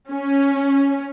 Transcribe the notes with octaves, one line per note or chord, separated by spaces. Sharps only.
C#4